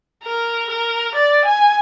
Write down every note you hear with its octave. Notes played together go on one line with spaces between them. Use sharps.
A#4
A#4
D5
G#5